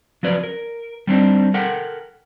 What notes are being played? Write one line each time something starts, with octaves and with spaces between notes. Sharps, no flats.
F3 F#3 C#4 B4 D5
A#4
G3 C4 D4 D#4
A4 A#4 F#5 G5